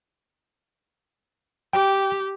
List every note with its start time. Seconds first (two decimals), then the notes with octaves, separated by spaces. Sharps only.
1.73 G4 G5